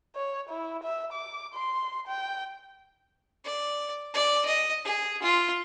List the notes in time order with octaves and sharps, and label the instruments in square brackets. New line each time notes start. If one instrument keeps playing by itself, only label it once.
[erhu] C#5
E4
E5
D6
C6
G5
[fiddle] D5
D5
D#5
G#4
F4